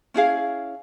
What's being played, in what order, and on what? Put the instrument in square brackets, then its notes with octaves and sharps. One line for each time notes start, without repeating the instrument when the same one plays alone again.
[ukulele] C#4 E4 G#4 F5